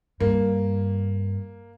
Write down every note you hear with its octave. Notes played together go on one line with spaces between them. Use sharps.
G2 A#3